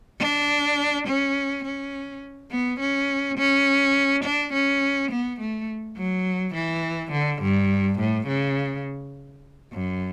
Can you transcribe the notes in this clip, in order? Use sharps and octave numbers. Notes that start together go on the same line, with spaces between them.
D4
C#4
C#4
B3
C#4
C#4
D4
C#4
B3
A3
F#3
E3
D3
G2
A2
C#3
F#2